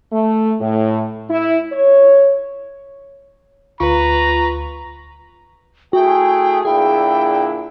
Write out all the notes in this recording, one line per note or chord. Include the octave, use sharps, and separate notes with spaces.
A3
A2
E4
C#5
D2 F4 B4 A#5 C#6
A3 E4 F#4 G#4 G5
A#2 D3 E4 G#4 G5